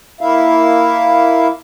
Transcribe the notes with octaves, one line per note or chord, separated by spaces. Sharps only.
A#3 E4 E5 F5